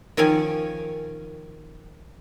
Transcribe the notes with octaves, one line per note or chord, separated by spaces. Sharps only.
D#3 F3 C#4 C#5 G#5